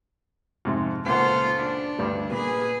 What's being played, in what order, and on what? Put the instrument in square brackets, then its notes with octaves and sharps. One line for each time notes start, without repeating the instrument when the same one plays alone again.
[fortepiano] F2 G#2 C3
[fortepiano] C#2 A#2 F#5 [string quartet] F4 A4 C5
[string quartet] D4
[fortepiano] D2 G2 G3
[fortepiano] A#2 [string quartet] G#4 B4